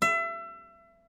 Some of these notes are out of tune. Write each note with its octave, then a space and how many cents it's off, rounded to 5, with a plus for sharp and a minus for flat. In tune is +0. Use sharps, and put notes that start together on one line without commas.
E5 +30